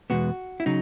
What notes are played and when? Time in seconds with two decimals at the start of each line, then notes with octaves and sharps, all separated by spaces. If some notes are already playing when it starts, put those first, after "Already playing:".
0.10 E2 B2 G#3 B3 F#4
0.60 E4
0.66 C#3 F#3 D#4